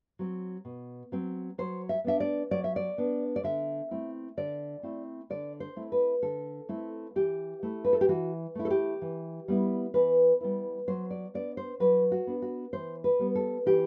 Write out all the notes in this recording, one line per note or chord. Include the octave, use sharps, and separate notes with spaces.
F#3 C4
B2
F#3 C4
F#3 C5
E5
B3 D4 E5
D5
F#3 D5
E5
D5
B3 D4
D5
D3 E5
A3 C4 E4
D3 D5
A3 C4 E4
D3 D5
C5
A3 C4 E4
B4
D3 A4
A3 C4 E4
E3 G4
A3 E4
B4
A4
G4
E3 F#4
A3 E4
A4
G4
E3
G3 B3 E4
E3 B4
G3 B3 E4
F#3 C5
D5
B3 D4 D5
C5
F#3 B4
F#4
B3 D4
F#4
E3 C5
B4
G3 B3
A4
E3 G4